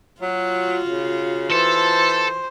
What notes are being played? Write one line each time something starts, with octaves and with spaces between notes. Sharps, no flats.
F#3 F4 F#4
C#3
E3 A4 C5